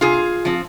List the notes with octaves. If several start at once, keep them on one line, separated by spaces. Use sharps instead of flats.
C3 F4 G#4
F3 C4